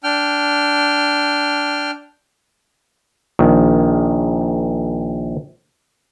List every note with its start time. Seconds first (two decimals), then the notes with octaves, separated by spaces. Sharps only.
0.04 D4 G5 F6
3.39 A#1 D#3